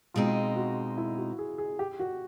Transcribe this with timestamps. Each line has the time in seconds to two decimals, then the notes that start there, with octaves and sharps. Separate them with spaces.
0.14 B2 G#3 C4 D#4 F4
0.56 F#4
0.97 E4
1.17 F#4
1.39 G#4
1.58 G#4
1.79 G4
1.99 F#4